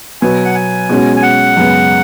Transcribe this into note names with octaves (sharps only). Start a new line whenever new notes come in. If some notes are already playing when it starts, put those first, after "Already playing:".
B2 F#3 B3 G#5
F#5
G#5
B2 G#3 C#4 F#4
G#5
F#5
F#2 C#3 G#3 B3